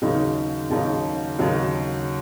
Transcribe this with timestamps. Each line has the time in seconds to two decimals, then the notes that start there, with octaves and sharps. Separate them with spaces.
0.02 D#2 C#3 F#3 D#4
0.70 D#2 C#3 F#3 D#4
1.39 D#2 C#3 F#3 D#4